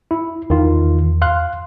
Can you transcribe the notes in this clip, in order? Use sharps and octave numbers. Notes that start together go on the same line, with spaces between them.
E4
E2 D#3 F4
F5 C6 F#6